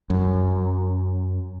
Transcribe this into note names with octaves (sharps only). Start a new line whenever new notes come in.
F#2